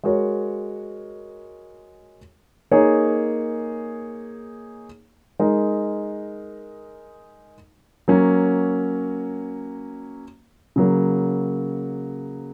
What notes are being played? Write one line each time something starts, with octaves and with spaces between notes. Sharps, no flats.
G#3 F#4 A#4 C#5
A#3 D#4 G#4 C#5
G#3 D#4 A#4
F#3 A#3 C#4
C#3 F#3 A#3